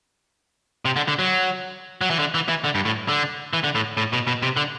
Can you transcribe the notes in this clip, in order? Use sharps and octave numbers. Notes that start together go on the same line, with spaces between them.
C3
D3
D3
F#3
F#3
E3
D3
E3
E3
D3
G2
A2
D3
E3
D3
A2
A2
B2
B2
C3
D3